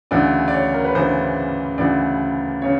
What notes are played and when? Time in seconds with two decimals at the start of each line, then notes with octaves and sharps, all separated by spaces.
0.11 D2 C#3 E3 D5
0.48 D5
0.52 C#5
0.74 A#4
0.84 B4
0.95 D2 C#3 E3 C5
1.78 D2 C#3 E3 D5
2.62 C#3 C#5